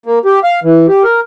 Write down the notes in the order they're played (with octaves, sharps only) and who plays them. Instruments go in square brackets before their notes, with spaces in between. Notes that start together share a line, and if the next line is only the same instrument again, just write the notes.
[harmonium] A#3
G4
F5
E3
G4
A#4